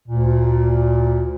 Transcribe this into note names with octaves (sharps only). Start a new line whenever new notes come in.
D2 A#2